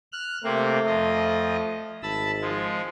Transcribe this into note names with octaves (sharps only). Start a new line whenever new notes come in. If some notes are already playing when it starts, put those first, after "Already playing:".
F6 F#6
C3 A3 A#3 C4
F2 F3 D#5
G#1 A5 B5 E6
F3 G#3